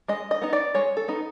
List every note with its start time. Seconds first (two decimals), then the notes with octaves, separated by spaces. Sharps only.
0.08 G#3 D#5
0.31 D#5
0.42 B3 D#4
0.53 D5
0.75 G#3 C#5
0.97 A4
1.08 B3 D#4